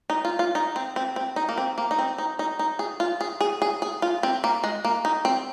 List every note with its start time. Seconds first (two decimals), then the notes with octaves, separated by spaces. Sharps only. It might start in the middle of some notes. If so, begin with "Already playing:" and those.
0.10 D#4
0.25 F4
0.39 F4
0.55 D#4
0.76 C4
0.96 C4
1.16 C4
1.36 D#4
1.49 A#3
1.58 C4
1.78 A#3
1.91 D#4
1.99 C4
2.18 D#4
2.39 D#4
2.59 D#4
2.79 G#4
3.00 F4
3.21 G#4
3.41 G#4
3.62 G#4
3.82 G#4
4.02 F4
4.23 C4
4.44 A#3
4.64 G#3
4.84 A#3
5.05 D#4
5.25 C4